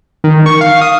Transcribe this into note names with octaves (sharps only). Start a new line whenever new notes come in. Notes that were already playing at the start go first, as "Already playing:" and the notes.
D#3
C#6
F5
D#6